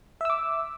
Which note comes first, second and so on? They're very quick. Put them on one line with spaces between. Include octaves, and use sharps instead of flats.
E5 E6 D6